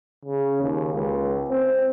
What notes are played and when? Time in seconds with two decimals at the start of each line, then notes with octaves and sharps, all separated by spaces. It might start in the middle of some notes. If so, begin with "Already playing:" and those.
0.25 C#3
0.62 D#2
0.93 C#2
1.49 C4